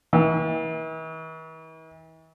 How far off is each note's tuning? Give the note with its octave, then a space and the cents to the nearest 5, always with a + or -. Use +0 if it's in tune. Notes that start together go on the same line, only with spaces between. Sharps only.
E3 -45